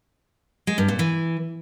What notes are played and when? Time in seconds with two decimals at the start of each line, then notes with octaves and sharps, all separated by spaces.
0.67 G#3
0.78 G2
0.88 A#2
0.99 E3